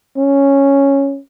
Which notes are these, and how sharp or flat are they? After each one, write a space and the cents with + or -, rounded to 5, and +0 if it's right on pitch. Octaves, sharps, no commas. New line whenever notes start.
C#4 -5